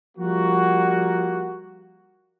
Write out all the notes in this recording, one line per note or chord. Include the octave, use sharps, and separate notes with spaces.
F3 G3 A#3 F#4